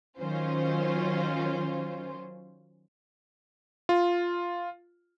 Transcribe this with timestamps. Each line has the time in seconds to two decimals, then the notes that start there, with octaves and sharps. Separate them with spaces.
0.19 D#3 F#3 C#4 F4 C5
3.89 F4